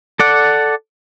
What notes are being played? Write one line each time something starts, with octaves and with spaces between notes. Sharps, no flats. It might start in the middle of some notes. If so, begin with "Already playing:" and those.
A4 D5 F#5